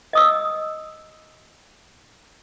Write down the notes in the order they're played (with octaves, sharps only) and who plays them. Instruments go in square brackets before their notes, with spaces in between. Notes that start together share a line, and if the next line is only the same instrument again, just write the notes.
[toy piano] D#5 D#6 E6